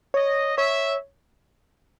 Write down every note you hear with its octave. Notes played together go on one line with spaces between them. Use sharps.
C#5 D#5
C#5 E5